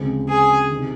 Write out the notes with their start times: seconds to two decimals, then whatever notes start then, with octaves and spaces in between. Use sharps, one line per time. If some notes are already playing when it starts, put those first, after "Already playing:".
Already playing: D2 C#3 F3 G#3 C4
0.28 G#4
0.71 C3 D#3